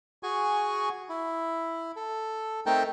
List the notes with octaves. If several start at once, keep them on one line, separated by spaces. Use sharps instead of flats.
F#4 G#4 G#5 C#6
E4
A4
A3 C4 D#4 A#4 G5 A5